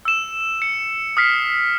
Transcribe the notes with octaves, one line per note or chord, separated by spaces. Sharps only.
E6 E7
C#7
D#6 F6 B6 C7